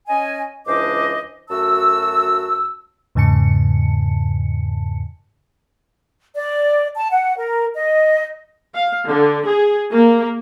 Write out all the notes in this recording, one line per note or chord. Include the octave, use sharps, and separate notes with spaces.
C#4 D#5 G#5
C#2 E3 D4 C5 D#5 D6
F#2 A3 F#4 A5 E6
E2 G#2 C#3 A5 C#7
D5
A5
F#5
A#4
D#5
F5
D3
G#4
A#3